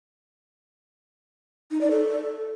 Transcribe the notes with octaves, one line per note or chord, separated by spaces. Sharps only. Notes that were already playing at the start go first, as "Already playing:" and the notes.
D#4
D5
A4